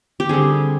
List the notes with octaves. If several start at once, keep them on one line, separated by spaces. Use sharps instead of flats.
G4
D3 G3 C4 G#4